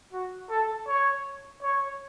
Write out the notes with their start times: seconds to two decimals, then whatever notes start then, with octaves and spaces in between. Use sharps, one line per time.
0.13 F#4
0.50 A4
0.87 C#5
1.63 C#5